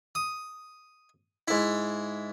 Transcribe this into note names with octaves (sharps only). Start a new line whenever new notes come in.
D#6
G#2 E4